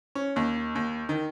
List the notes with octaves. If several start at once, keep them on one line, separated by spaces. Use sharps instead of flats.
C#4
D#2
D#2
D#3